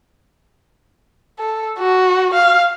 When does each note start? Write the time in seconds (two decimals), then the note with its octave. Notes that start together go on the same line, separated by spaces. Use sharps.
1.39 A4
1.78 F#4
2.33 F5